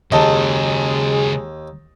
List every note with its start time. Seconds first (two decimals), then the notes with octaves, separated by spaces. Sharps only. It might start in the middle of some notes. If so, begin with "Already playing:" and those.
0.12 D#2 C#3 F#3 G#3 D#5 A5